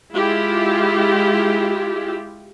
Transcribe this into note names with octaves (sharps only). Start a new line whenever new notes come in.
G#3 E4 F4 G4